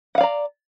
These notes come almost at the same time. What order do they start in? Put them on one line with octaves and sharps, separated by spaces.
F#5 F5 D5 A#5